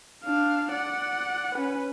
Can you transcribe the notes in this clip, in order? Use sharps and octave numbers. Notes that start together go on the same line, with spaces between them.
D4 F5
D5 F#5
C#4 B4